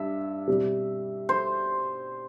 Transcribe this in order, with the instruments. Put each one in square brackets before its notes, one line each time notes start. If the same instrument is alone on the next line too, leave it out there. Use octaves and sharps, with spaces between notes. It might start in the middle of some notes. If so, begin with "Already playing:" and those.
Already playing: [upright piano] G2 [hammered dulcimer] E5
[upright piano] B2 G3 C4
[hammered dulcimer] C5